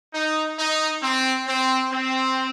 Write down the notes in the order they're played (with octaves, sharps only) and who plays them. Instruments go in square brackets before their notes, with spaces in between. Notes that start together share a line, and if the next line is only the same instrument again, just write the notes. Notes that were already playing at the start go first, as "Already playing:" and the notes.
[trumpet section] D#4
D#4
C4
C4
C4